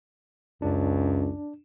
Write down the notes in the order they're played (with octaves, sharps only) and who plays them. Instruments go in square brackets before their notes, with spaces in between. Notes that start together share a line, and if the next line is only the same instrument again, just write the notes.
[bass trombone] C#2 [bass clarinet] F#2 [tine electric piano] D4